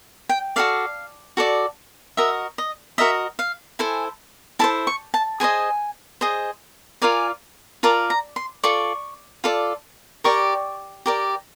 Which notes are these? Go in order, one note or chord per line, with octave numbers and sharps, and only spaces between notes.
G5
F#4 A4 D5 F5
F#4 A4 D5
F#4 A#4 D#5 E5
D#5
F#4 A#4 D#5 E5
F5
E4 A4 C5 G#5
E4 A4 C5 A5
C#6
A5
G#4 C5 D#5 G#5
G#4 C5 D#5
F4 A#4 D5 G#5
F4 A#4 D5 A5
A#5
C6
F4 A4 D5 C#6
F4 A4 D5
G4 A#4 D5 C#6
G4 A#4 D5